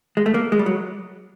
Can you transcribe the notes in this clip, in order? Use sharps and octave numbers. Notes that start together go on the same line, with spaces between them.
G#3
A3
A#3
G#3
G3
F#3